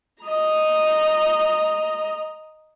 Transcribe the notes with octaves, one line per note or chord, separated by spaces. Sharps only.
D#5 A#5